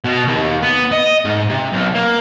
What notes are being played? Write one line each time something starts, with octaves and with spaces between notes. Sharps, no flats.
B2
D#2
B3
D#5
G#2
C3
B1
A#3